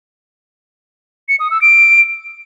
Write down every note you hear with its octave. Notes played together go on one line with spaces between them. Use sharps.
C#7
D#6
E6
D7